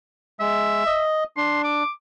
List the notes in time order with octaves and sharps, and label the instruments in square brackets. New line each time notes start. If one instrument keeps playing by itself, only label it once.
[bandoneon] G#3 [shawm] E5
[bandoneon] D#5
[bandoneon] D4 [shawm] C6
[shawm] D6